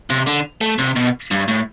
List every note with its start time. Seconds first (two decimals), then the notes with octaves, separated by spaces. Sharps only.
0.10 C3
0.27 D3
0.61 A3
0.79 C3
0.96 B2
1.31 G2
1.48 A2